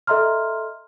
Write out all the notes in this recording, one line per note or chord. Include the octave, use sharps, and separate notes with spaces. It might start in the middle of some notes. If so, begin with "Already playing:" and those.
A4 D#5 E5 A#5 C6 F6